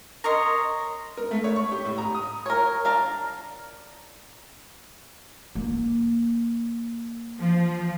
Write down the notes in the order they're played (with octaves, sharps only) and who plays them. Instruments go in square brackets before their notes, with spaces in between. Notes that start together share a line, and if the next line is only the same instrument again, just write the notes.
[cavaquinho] A#4 C#5 D#5 C6
[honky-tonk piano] A#4
A3
C#5
C#6
G4
A2
A#5
D#6
[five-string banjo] A#4 C#5
D4 F5 A#5
[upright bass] A#3
[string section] F3